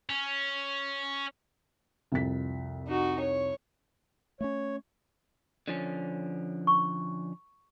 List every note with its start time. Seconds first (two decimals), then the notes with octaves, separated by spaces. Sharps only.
0.09 C#4
2.12 C2 F2 B6
2.88 D#4 F#4
3.20 C#5
4.41 A3 A#3 C#4 C#5
5.68 D3 F3 C#4
6.67 C#6